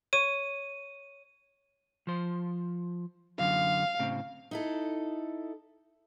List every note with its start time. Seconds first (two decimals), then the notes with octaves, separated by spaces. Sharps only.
0.13 C#5 C#6 D#7
2.07 F3 C5
3.39 F#2 D3 F#3 F5
3.99 A2 C#3 C4
4.51 D#4 E4 A4